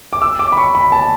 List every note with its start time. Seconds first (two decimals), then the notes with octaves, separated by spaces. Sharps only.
0.13 D6
0.22 E6
0.39 D6
0.52 B5
0.57 C#6
0.75 B5
0.92 A5